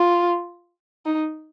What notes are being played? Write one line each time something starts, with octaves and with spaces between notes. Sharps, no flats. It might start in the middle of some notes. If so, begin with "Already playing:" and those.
Already playing: F4
D#4